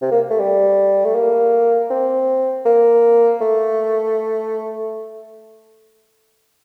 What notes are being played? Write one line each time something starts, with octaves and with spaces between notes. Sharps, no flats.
C3
A#3
A3
G3
A3
A#3
C4
A#3
A3